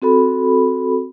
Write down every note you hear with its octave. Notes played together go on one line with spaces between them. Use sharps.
C4 F#4 A4 B5